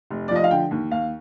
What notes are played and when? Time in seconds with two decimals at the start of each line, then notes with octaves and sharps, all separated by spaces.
0.11 F1
0.28 D5
0.31 F3 D#5
0.44 F5
0.51 D3 G5
0.71 D#2
0.91 D#2 F5